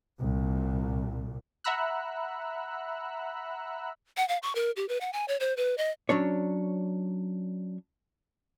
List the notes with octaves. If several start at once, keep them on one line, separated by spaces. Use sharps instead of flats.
C2 A#2
E5 F#5 A#5 B5 E6 F#6
F#5
F5
C#6
A#4
G4
B4
F#5
G#5
C#5
C5
B4
D#5
F#3 C#4 D4 C#5